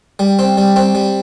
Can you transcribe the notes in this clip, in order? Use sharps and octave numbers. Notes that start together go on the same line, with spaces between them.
G3
C4
G3
C4
G3